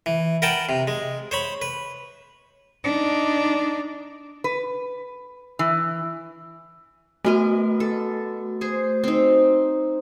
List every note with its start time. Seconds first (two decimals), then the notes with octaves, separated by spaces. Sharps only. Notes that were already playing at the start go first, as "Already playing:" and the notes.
0.06 E3
0.42 A#4 B4 F#5 G5 A5
0.69 C3
0.88 G#3
1.31 C5 C#5 B5
1.62 B4
2.84 D4 D#4
4.44 B4
5.59 E3
7.25 A3 B3 F#4 A#4 D#5
7.80 A4
8.61 G#4 C5
9.04 C4 D#4